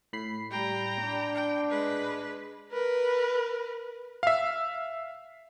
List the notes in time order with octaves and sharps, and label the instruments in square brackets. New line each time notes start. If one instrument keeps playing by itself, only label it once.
[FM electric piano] A2 B5 C7
[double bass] G3 [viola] G5 A#5
[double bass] D4
[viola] G5
G#3 B4
A#4 B4
[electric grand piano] E5 F5